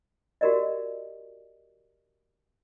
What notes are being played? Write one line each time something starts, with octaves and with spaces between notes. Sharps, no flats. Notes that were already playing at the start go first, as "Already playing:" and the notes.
F#4 G4 A#4 D5 D#5